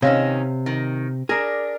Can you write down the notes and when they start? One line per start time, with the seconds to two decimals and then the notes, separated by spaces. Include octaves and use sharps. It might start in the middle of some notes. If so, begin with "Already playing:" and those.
0.02 C3 D#3 C#4 D#4 C#5 F5
0.66 D#3
1.29 D4 G#4 A#4